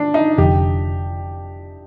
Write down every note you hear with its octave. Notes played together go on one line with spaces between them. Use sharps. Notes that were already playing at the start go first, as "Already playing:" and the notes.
Already playing: D4
D#4
F1 F2 D3 G4